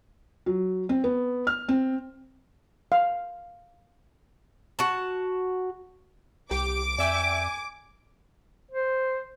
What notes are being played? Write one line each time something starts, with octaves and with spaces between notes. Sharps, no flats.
F#3
C4
B3
F6
C4
F5
F#4 A5
C2 G4 D6
F2 D5 E5 G5 G#5
C5